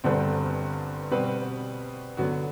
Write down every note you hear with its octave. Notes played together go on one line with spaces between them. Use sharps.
G1 G2 D3 G3 C4
B2 G3 C4 F#4 B4
D3 F#3 B3 F#4